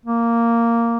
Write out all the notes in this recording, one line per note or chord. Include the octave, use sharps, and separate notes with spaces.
A#3